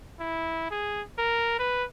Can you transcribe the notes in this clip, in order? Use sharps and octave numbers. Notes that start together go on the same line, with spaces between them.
E4
G#4
A#4
B4